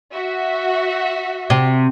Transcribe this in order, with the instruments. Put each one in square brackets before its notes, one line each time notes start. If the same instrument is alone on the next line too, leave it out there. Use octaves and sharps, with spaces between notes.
[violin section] F#4 E5
[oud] C3